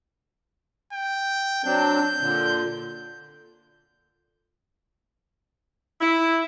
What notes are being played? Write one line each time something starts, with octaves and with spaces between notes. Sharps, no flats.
G5
F#3 C4 D4 G6
A#2 D3
E4